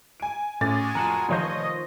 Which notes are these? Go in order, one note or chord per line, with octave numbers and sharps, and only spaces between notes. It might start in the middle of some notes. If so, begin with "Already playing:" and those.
G#5 D7
A2 G#3 C#4 F#4 G#5 D6 A6
F2 A#4 F#5 A5
F1 D#3 F3 C5 C#5 D#5 G6